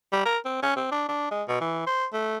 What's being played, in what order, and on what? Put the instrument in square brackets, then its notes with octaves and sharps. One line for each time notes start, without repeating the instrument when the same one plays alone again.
[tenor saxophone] G3
A#4
C4
C#4
C4
D4
D4
G#3
B2
E3
C5
A3